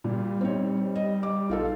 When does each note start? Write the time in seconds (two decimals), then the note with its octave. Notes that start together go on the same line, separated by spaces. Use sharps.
0.04 A#2 G3
0.41 C4 D#4 C#5
0.96 D#5
1.23 D6
1.50 A#1 D#4 F4 A4